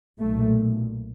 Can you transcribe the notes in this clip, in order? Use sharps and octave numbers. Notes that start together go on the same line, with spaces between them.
B1 A#2 A3